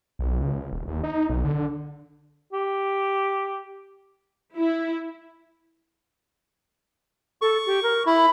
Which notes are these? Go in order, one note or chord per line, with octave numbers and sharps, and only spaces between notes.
B1
C#2
D#1
D#2
D#4
B1
D3
G4
E4
A4 C#6
G4
A#4
E4 B5